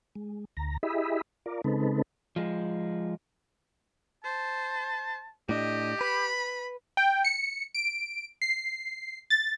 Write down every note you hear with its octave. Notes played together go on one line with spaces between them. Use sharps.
G#3
D2 A#5
E4 G4 G#4 D#5 E5 B5
F4 A#4 D5
C#3 G#3 C4 D#4 A4 B4
F3 G#3
C5 A5
A2 D4 G4 D#5
B4 B5
G5
C#7
D7
C7
A6